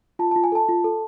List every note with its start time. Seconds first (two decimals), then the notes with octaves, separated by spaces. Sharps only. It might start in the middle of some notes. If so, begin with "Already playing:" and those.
0.19 F4 A5
0.31 A5
0.36 F4
0.44 G#5
0.52 A4 A5
0.69 F4
0.84 A4